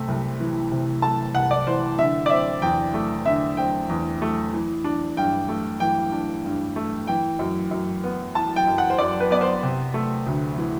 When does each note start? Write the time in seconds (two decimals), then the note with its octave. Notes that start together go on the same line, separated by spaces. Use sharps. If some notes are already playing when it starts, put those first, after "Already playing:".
Already playing: C3 A3
0.08 C2
0.40 E3
0.71 C3
1.02 A3 A5
1.35 C2 F#5
1.51 D5
1.67 E3 C5
1.99 D3 E5
2.26 D5
2.30 C4 E5
2.62 E2 G5
2.94 A3
3.25 D3 E5
3.57 C4 G5
3.89 E2
4.22 A3
4.53 E3
4.84 D4
5.17 G2 G5
5.49 A3
5.80 E3 G5
6.12 D4
6.45 G2
6.76 A3
7.07 E3 G5
7.39 F#2
7.71 F#2
8.04 B3
8.35 E3 A5
8.56 G5
8.67 F#2
8.78 F#5
8.90 C5
8.98 F#2 D5
9.20 B4
9.31 B3 D5
9.41 C5
9.63 C3
9.94 A3
10.27 D2
10.58 E3